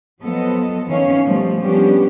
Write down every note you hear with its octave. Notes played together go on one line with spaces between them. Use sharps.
F3 F#3 B3 A4 D#5
D#3 E3 C#4 C#5 F5
B2 F3 G3 A3
F3 G3 B3 C#4 D4 G4